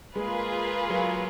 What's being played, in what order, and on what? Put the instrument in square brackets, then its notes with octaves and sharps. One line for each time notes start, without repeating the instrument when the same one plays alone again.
[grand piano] G#3 [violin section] A#3 F4 G#4 B4
[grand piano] F#3